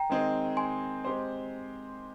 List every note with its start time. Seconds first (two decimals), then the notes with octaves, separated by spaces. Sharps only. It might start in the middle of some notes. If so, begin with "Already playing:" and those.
Already playing: G5 A#5
0.10 D#3 G#3 C4 D#4 G#4
0.57 G#5 C6
1.05 G#3 C4 G4 C5